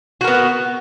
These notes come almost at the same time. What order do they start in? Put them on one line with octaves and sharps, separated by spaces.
F#4 A#4 B3